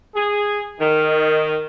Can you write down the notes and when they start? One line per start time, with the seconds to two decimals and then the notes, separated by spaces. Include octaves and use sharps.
0.15 G#4
0.79 D#3